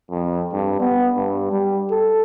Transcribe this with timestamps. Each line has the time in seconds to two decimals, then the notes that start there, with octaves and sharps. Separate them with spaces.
0.11 F2
0.52 G2
0.81 B3
1.16 G2
1.52 G3
1.91 A4